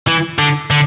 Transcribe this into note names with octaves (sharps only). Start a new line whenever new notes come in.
E3
D3
D3